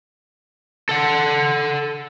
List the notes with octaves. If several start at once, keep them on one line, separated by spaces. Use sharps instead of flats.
A4 F#5